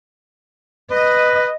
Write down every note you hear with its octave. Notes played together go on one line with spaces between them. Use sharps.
B4 D#5